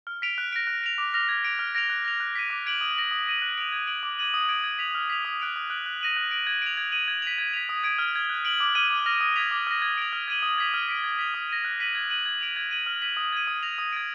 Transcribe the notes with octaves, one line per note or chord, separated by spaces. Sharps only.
F6
B6 D7 F7
F#6
A#6 D7
F#6
D7 F7
D6
F6 A#6 F7
G#6
D7 F7
F6
A#6 D7 F7
F#6
A#6 F7
F#6
B6 D#7
D6
G#6 D7 F#7
D#6
A#6 D7 F#7
D#6
A#6 D#7 F#7
F#6
D7 F7
G#6
D7 F#7
D6
G#6 D#7 F#7
D#6
G#6 D7 F#7
G#6
B6 F7
F6
B6 F7
D#6
F#6 D7 F7
D#6
F#6 D7 F#7
F#6
A#6 D#7 F#7
F#6
D7 F#7
G#6
D7 F7
G#6
D#7 F#7
G#6
B6 F7
G#6
B6 F7
D#6
G#6 D7
F6
G#6 D7
F#6
D7 F#7
D6
F6 G#6 D#7
D6
F6 A#6 F7
D#6
G#6 B6 F7
D6
F6 A#6
G#6
D7 F7
F6
G#6 D#7 F#7
D#6
G#6 B6 F7
F6
B6 D7
G#6
B6 F7
D#6
A#6 D#7
F#6
B6 D#7 F#7
G#6
D#7 F#7
G#6
D7 F7
G#6
D#7 F#7
F6
B6 D#7 F#7
D#6
G#6 D#7
D#6
A#6 F7
D#6
G#6 D7